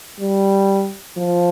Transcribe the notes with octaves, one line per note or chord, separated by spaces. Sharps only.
G3
F3